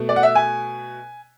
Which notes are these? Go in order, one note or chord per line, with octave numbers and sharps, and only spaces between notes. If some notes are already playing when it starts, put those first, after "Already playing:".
Already playing: B2 A3
D5
F#5
E5
G#5